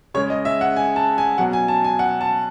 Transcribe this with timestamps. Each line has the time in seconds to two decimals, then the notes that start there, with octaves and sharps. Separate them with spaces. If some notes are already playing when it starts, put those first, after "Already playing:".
0.14 C#3 G#3 C#5
0.30 D#5
0.45 E5
0.61 F#5
0.76 G#5
0.96 A5
1.18 G#5
1.38 B2 F#3 F#5
1.53 G#5
1.68 A5
1.84 G#5
1.99 F#5
2.21 A5